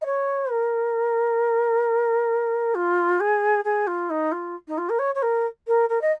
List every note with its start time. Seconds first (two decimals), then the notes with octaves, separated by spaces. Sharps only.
0.01 D#5
0.05 C#5
0.50 A#4
2.75 F4
3.20 G#4
3.64 G#4
3.87 F4
4.10 D#4
4.32 F4
4.68 D#4
4.78 F4
4.89 A#4
4.99 C#5
5.15 C#5
5.22 A#4
5.67 A#4
5.89 A#4
6.01 D#5